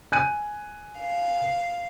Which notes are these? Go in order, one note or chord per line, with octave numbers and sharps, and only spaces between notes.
G#5 F#6 D#7
F5